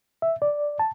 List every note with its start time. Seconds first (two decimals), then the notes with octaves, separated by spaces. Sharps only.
0.22 E5
0.42 D5
0.79 A5